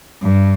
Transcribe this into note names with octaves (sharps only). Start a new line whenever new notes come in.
G2